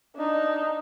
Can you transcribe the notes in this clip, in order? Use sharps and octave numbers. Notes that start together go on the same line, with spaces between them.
D4 D#4